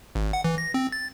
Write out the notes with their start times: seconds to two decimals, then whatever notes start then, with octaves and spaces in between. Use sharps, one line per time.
0.15 G#1
0.33 F#5
0.44 E3
0.58 A#6
0.74 C4
0.92 A6